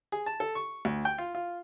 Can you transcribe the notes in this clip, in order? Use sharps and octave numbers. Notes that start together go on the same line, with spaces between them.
G#4
A5
A4
C#6
D2
G5
F4
F4